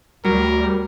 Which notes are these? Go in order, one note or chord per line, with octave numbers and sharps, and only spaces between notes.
D2 F#3 G3 A#4